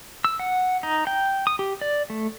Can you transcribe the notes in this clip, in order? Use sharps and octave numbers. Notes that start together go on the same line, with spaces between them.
E6
F#5
D#4
G5
D#6
G4
D5
A3